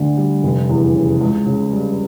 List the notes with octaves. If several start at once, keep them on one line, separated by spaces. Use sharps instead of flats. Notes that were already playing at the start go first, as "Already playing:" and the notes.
Already playing: D2 D3
G3
F1
E2
C#3
C#2
C#3
G3